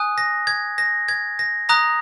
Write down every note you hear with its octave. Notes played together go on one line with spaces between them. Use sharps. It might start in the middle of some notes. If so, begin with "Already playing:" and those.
Already playing: G#5 D#6 F#6
A#6
G#6
A#6
G#6
A#6
A#5 D#6 F#6 A#6